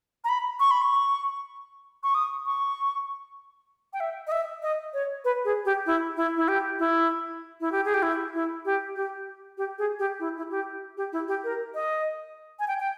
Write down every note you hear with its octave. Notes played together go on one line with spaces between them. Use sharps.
A#5
B5
C#6
B5
C#6
C#6
D#6
C#6
G5
E5
D#5
E5
D#5
C#5
B4
G#4
G4
E4
E4
E4
G4
E4
E4
G4
G#4
G4
E4
E4
G4
G4
G4
G#4
G4
E4
E4
G4
G4
E4
G4
A#4
D#5
G#5
G5
G5